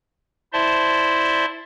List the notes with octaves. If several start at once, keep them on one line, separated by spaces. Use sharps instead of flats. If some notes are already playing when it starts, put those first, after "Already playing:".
E4 C5 D5 E5 A5 C6